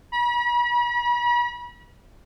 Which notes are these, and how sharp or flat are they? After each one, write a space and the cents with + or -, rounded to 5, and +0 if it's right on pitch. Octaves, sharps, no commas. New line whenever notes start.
B5 -40